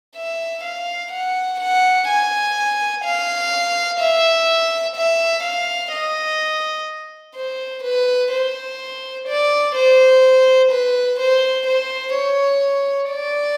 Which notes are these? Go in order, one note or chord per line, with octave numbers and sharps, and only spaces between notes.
E5
F5
F#5
F#5
G#5
F5
E5
E5
F5
D#5
C5
B4
C5
D5
C5
B4
C5
C5
C#5
D5